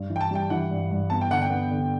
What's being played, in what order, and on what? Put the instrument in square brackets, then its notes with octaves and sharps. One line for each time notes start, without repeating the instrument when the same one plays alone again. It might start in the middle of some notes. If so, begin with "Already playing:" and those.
Already playing: [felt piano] G2
E3
[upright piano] G5
A5
[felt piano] G3 [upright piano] G5
[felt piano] E3 [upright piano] F#5
[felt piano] G2
G2
[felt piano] B3 [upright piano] A5
[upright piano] G5
[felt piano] D3 [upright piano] F#5
[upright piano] G5
[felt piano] B3
D3